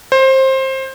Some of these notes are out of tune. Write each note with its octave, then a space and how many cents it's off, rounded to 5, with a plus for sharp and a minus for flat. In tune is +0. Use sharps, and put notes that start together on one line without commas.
C5 +20